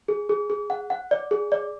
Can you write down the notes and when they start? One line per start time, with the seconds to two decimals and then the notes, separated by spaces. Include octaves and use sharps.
0.08 G#4
0.29 G#4
0.50 G#4
0.70 F#5
0.90 F#5
1.11 D5
1.31 G#4
1.52 D5